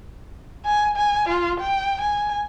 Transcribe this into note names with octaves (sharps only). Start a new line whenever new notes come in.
G#5
G#5
F4
G5
G#5